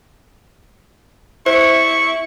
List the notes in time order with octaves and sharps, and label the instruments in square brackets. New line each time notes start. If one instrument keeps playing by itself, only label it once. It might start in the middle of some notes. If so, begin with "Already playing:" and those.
[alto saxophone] E4 [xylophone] C5 [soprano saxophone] C#6